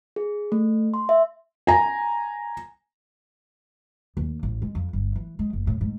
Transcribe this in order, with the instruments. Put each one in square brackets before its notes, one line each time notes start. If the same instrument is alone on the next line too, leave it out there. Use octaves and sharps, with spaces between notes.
[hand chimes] G#4
A3
C6
E5
[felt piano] G#5 A#5
[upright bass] D#2
A1
G#3
F2
G1
E3
G#3
F#1
A2
G#2